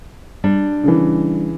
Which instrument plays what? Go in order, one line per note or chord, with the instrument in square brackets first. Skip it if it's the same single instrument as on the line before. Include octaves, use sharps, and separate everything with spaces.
[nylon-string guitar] G3 D4
[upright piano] C#3 E3